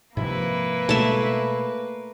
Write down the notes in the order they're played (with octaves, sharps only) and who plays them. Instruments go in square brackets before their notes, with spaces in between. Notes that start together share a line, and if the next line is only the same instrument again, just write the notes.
[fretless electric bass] G#2 C3 F3 [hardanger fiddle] A#3 B4 [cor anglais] E4
[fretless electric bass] B2 G#3 [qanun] A3 E5